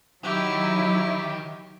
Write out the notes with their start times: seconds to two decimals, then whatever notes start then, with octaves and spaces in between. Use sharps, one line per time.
0.24 D#3 F#3 D#4 E4 G4